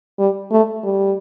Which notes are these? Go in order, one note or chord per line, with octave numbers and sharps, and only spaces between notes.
G3
A3
G3